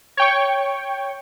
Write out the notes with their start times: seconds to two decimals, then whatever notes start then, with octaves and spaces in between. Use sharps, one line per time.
0.17 C#5 G5 C#6